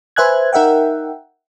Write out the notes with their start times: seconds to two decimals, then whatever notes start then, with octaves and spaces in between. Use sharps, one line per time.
0.16 B4 C5 E5 G#5 F#6 G#6
0.53 D#4 A#4 E5 F#5 G5